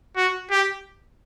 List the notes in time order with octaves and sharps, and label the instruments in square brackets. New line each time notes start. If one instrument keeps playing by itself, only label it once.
[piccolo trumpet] F#4
G4